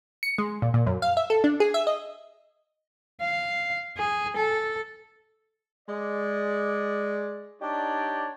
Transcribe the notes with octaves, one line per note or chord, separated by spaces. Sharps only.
C#7
G#3
A#2
A#2
F#2
F5
E5
A4
D4
G#4
E5
D#5
F5
G#4
A4
G#3 D5
D4 D#4 G4 C#5 D5